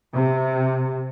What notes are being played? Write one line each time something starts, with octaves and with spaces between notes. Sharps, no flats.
C3